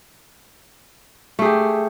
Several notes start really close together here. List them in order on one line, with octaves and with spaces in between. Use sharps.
A3 G#4 G4